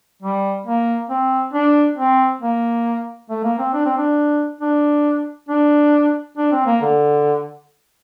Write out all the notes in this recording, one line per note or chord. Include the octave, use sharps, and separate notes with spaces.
G3
A#3
C4
D4
C4
A#3
A3
A#3
C4
D4
C4
D4
D4
D4
D4
C4
A#3
D3